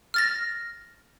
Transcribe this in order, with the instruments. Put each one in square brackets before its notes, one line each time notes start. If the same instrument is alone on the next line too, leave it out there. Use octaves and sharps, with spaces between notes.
[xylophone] F6 A6 A#6